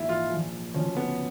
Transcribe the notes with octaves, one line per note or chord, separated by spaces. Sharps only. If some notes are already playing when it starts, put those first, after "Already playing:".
Already playing: A#1 G#2 E3 E4
F4
A#1 A#2 F3
D2 C#3 F3 C#4
B3